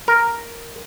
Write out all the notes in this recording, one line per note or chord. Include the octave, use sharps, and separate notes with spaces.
A#4